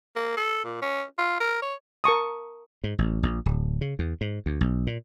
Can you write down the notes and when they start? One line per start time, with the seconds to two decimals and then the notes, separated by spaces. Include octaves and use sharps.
0.16 A#3
0.37 A4
0.65 A#2
0.82 C#4
1.18 F4
1.40 A#4
1.62 C#5
2.04 A#4 A5 C#6 D#6
2.84 G#2
2.98 A1
3.23 A#1
3.46 D1
3.81 C#3
3.99 E2
4.21 G#2
4.46 D2
4.61 B1
4.87 A#2